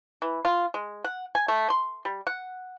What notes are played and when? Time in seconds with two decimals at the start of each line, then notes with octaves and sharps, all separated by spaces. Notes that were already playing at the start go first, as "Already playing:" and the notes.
0.22 E3
0.45 F4
0.74 G#3
1.04 F#5
1.35 G#5
1.48 A3
1.70 C6
2.05 G3
2.27 F#5